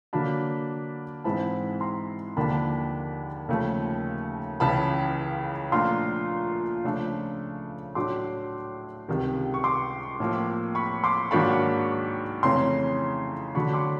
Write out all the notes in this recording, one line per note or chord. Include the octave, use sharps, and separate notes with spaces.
D3 F#3 A#3 D4 A5 B5
G#2 E3 G#3 C4 E4 A5 B5
A#5 C6
D#2 D3 F3 A#3 D4 A5 B5
D#2 C#3 F3 A3
C#2 C#3 E3 A5 B5
A#2 F3 A3 D4 F4 A#5 C6
C#3 F3 A3 D4
A2 F#3 A3 D4 C6 D6
C#2 C3 D#3 G3
C#6
C6 D6
A2 F3 A#3
B5 C#6
C6 D6
G#2 D#3 F#3 A#3 D4 B5 C#6
F2 C#3 E3 A3 C#4 A#5 C6
D3 F#3 A3 D4 B5 C#6
C6 D6